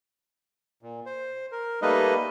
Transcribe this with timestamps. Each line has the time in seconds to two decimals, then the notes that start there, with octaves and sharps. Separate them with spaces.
0.82 A#2
1.06 C5
1.52 A#4
1.82 G3 A3 A#3 D#4 B4 D#5